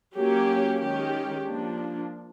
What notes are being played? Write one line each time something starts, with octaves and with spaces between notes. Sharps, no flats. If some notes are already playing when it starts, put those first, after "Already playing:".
F#3 A#3 C#4 G4
D#3 G#3 C#4 G4
F3 A#3 D4